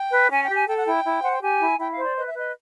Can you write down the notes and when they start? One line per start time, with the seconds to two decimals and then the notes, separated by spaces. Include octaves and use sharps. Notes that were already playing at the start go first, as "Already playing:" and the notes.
Already playing: G5
0.11 B4
0.30 C#4 G#5
0.42 G5
0.49 G4
0.54 G#5
0.68 A4 G5
0.76 F#5
0.84 E4 G5
1.04 E4
1.22 C5 F#5
1.32 G5
1.41 G4 G#5
1.60 E4
1.79 E4 G5
1.91 F5
1.97 C5
2.04 D5
2.16 B4 D#5
2.26 E5
2.34 B4 D#5